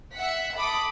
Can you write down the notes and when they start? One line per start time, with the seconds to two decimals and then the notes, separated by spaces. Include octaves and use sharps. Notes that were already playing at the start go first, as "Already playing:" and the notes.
0.15 E5 F#5 B6
0.57 A4 B5 D6 D#6